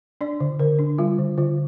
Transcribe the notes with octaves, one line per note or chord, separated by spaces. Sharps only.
D4 D5
D3
D3 A#4
D4
G3 F4
D3
D3 F4